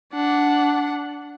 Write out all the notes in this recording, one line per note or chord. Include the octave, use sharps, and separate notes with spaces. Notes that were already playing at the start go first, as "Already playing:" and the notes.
D4 F#5